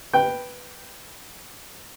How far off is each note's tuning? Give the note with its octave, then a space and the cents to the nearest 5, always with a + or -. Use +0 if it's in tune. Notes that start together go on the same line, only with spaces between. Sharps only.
B4 +0 G5 +0